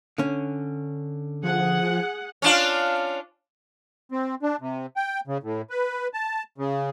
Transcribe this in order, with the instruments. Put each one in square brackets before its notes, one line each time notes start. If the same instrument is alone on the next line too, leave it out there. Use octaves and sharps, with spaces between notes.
[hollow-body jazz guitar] D3 C#4
[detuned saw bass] F3 [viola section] G#4 F#5
[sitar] C#4 D4 F4
[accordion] C4
D4
C3
G5
C#3
A2
B4
A5
C#3